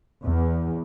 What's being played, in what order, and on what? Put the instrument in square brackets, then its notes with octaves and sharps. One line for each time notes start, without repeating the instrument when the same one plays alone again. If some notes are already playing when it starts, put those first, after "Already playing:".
[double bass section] E2